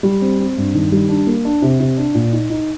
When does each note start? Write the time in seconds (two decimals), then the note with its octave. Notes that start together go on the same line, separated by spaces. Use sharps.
0.03 G3
0.22 C4
0.39 C4
0.57 G2
0.74 D#3
0.92 G3
1.09 D4
1.27 A#3
1.45 D4
1.62 C3
1.80 C3
1.97 D4
2.15 A#2
2.32 D#4
2.50 D#4